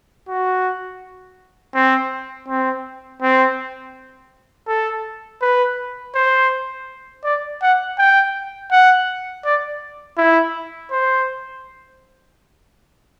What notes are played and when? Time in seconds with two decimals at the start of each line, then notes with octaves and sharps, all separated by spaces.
0.28 F#4
1.74 C4
2.48 C4
3.22 C4
4.68 A4
5.42 B4
6.15 C5
7.24 D5
7.62 F#5
7.98 G5
8.71 F#5
9.45 D5
10.18 E4
10.91 C5